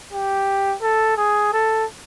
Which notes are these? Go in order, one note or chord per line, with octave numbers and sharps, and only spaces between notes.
G4
A4
G#4
A4